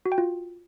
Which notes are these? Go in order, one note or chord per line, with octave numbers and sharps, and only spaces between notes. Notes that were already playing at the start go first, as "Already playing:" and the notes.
F#4
G5
F4